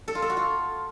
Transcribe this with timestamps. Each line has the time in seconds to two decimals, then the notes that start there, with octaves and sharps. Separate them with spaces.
0.08 A4
0.15 F4
0.22 A4
0.30 F#4
0.37 F4